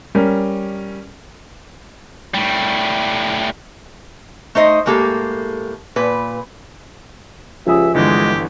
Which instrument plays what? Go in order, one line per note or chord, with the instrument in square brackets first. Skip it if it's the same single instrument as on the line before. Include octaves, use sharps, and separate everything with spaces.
[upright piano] G3 C#4 A#4
[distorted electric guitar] A2 G3
[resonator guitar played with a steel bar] A3 D#4 C5 D#5
A2 G#3 A#3 G4 A4
A#2 B4
[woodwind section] C#2 G4 E5 [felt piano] F3 G#5 D#6
[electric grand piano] G1 D3 E3 [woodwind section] G#3 [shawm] G4